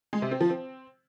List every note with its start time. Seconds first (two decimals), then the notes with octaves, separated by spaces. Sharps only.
0.13 G#3
0.22 C3
0.31 C4
0.41 F3
0.50 C4